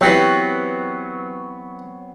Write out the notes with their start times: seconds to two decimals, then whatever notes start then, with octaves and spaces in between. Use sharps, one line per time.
0.01 E3 F#3 B3 C4 F#4 G4 C#5